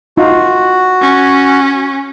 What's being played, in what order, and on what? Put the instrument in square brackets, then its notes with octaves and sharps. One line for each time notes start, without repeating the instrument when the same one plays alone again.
[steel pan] D#4 F4 [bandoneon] F#4
[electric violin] C#4